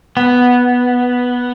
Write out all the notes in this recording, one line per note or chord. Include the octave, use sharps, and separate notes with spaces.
B3